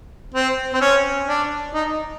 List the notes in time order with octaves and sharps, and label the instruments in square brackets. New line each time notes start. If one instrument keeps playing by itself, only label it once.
[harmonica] C4
C4
C#4
D4
D#4